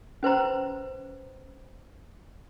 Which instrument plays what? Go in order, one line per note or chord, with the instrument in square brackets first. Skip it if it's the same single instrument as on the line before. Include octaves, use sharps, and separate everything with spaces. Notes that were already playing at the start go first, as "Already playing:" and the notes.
[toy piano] C#4 B4 C5 A#5